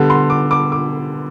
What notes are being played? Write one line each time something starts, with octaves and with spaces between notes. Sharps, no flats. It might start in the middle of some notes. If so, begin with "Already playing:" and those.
Already playing: D3 G3 B3
C6
D6
D6
D6